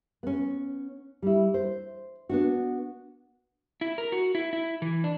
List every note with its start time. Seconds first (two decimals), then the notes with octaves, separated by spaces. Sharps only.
0.23 B3 C#4
1.22 G3 E4
1.54 C5
2.29 B3 D4 F#4
3.81 E4
3.98 A#4
4.12 F#4
4.35 E4
4.53 E4
4.82 E3
5.04 D4